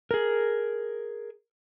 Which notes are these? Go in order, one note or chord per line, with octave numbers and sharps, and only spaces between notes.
G#4 A#4